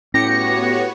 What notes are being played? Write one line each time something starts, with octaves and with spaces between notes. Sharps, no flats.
A2 B3 C#4 F#4 G4 C#5 A#6 C#7